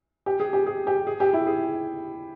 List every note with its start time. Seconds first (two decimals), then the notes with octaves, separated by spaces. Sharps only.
0.26 G4
0.40 G#4
0.53 G4
0.67 G#4
0.87 G4
1.07 G#4
1.20 G4
1.33 E4
1.47 G#4